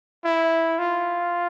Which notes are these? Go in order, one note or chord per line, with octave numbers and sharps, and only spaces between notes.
E4
F4